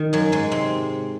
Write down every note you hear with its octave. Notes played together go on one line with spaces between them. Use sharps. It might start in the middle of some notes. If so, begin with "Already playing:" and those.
Already playing: D#3
F#2 F#3
G#2 G#3
C3 C4